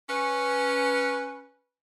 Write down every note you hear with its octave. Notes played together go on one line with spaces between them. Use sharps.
C#4 B4